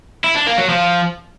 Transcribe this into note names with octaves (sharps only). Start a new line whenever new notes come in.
E4
D4
A#3
F#3
F3